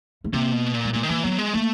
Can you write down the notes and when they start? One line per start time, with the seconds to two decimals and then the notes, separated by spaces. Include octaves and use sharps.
0.24 A3
0.33 C3 A#3
0.53 B2
0.74 A#2
0.85 G#3
0.93 A#2 A3
1.03 D#3
1.09 E3 A#3
1.24 F#3 B3
1.38 G#3
1.53 A3 A#3